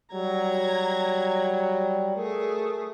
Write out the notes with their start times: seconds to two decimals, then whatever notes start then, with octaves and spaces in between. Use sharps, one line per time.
0.13 F#3 G3 A#5 G#6
2.17 A3 G#4 A#4